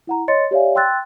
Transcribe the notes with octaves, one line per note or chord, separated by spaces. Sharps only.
E4 F#5 A#5
C#5 D#5 C6 A6 C#7
G4 C#5 D5 E5 F5 G#5
G5 C6 E6 F#6 A6